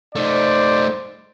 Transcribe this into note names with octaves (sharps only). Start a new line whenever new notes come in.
A3 D#4 C5 D5